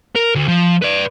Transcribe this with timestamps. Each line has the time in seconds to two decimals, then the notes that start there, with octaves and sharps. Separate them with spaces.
0.15 A#4
0.35 D2
0.48 F3
0.82 B4 D5